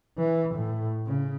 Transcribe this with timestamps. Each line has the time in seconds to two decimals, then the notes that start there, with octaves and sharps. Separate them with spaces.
0.18 E3
0.54 A2
1.06 C#3